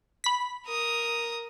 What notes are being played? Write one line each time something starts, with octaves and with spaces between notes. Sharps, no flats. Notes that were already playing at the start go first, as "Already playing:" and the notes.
B5 B6
A#4 D#6